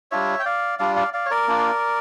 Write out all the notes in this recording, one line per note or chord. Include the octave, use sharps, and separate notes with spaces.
G3 D4 F4 C#5 E5
G5
D5 F5
G3 D4 F4 D5 F5
D5 F5
D5 F5
C#5
A#4 D5
A#3 D4 F4